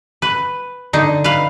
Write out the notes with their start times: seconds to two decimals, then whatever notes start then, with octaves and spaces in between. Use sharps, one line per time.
0.22 B4
0.93 D3 D#4
1.24 B4 F5